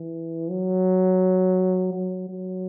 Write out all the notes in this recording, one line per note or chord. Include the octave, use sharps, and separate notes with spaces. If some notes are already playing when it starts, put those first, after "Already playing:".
Already playing: E3
F#3
F#3
F#3